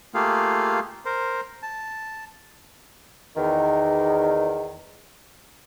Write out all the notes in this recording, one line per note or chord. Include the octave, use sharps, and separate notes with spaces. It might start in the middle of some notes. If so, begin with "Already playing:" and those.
A3 A#3 F4 G4 G#4 F5
A#4 C5
A5
E2 D#3